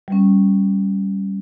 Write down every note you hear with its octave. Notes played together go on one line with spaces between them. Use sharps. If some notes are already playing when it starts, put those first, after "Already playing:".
G3 C#4